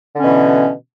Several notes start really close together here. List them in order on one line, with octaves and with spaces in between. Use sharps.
D3 C#4 B2 E3